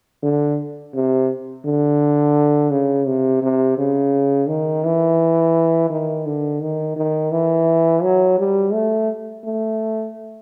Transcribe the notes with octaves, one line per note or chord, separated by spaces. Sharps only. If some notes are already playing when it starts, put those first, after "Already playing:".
D3
C3
D3
C#3
C3
C3
C#3
D#3
E3
D#3
D3
D#3
D#3
E3
F#3
G3
A3
A3